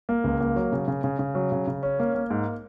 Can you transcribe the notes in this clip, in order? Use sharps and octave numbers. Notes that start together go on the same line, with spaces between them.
A#3
C#2
A#3
F#3
C#3
C#3
C#3
C#3
F#3
C#3
C#3
C#4
A#3
A#3
G#2